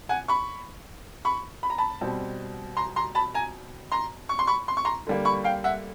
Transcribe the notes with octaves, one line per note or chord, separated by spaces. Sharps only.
F#5 G#5
B5 C#6
B5 C#6
B5
A#5
A5 B5
B2 G3 C4
A#5 C6
A#5 C6
A5 B5
G#5 A#5
A#5 C6
C#6
C6
B5 C#6
C6
C#6
A#5 C6
D3 G3 A#3
B5 C#6
F5 G5
E5 F#5